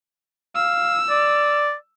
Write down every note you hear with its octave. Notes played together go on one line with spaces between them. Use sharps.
F5 E6
D5